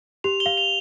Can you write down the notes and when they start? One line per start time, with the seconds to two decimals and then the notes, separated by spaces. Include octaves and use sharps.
0.24 G4 F7
0.40 G7
0.46 F5
0.57 F7